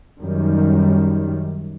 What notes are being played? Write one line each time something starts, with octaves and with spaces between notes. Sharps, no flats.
F#2 D#3 G3